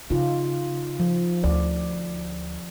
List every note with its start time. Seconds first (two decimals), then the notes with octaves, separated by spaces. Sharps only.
0.10 C#3 D#4 F4
1.00 F3
1.44 D2 D5